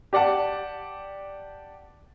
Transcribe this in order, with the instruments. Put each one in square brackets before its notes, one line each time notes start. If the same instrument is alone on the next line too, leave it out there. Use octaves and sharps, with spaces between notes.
[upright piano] G4 D5 F#5 A5